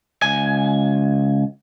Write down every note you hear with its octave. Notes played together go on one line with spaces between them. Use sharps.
C#2 G#5